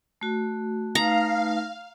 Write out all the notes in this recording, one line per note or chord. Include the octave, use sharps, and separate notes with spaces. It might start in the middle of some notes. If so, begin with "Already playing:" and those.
A3 F#4
A3 D#4 B4 F5 A#5